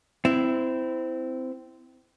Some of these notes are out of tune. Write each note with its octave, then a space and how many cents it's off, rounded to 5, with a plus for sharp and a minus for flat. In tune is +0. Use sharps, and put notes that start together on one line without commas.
C4 -20 E4 +0